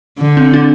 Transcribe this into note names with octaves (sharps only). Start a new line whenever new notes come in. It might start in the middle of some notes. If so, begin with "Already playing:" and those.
D3
C4
D4